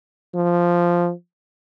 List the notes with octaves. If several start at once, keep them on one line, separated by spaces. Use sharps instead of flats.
F3